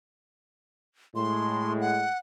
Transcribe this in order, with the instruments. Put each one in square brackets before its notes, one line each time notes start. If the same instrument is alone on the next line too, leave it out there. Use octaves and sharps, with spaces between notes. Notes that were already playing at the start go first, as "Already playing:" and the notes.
[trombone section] A2 G#3 [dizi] C6
[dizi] F#5